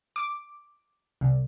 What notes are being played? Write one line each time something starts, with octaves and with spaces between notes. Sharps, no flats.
D6
C2